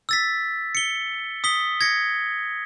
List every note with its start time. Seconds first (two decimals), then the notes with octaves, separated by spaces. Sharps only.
0.09 E6 A6 B6
0.75 C#7 G7
1.44 D#6 B6 G7
1.81 G#6 A#6 C#7